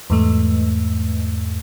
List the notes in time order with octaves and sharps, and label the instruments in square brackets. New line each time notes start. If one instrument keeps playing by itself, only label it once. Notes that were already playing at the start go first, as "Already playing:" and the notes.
[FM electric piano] E2 G#2 A3